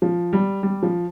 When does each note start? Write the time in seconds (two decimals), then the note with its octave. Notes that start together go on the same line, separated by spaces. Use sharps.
0.02 F3
0.33 G3
0.63 G3
0.83 F3